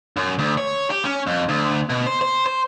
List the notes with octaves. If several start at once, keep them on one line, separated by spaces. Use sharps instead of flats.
F#2
D2
C#5
G4
C#4
F2
D2
B2
C5
C5
C5